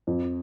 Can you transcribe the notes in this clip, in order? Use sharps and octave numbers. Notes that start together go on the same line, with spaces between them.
F2